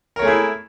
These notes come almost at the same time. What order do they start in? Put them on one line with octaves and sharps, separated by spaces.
A#4 C#5 A3 G#4 E4